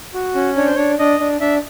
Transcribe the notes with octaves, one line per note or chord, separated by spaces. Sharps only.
F#4
C#4
D4 C#5
C5
D4 C#5
D4 D#5
D4
D4 E5